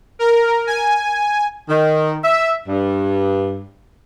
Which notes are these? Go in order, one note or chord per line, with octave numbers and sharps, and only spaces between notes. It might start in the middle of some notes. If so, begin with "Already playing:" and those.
A#4
G#5
D#3
E5
G2